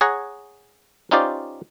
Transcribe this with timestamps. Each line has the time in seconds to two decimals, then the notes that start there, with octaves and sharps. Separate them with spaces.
0.01 G#4 C#5 F#5 A#5
1.11 C#4 D#4 F4 G4 C5 D5